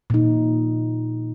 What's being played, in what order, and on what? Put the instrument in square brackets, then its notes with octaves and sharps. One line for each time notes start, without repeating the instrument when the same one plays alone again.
[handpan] A#2 D#4